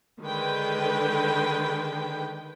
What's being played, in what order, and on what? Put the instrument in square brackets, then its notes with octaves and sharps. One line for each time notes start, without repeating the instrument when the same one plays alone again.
[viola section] D3 D#3 G#3 B4 G5